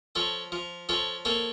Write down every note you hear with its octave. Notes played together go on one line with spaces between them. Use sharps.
F3 A4 C#5
F3
F3 A4 C#5
A#3 A4 C#5